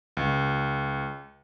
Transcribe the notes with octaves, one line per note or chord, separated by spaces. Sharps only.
C#2